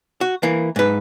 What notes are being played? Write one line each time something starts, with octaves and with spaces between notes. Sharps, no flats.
F#4
E3 A#3
G#2 B4